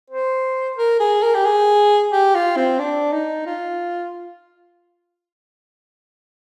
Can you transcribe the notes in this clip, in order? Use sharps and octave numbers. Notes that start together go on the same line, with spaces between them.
C5
A#4
G#4
A#4
G4
G#4
G4
F4
C4
D4
D#4
F4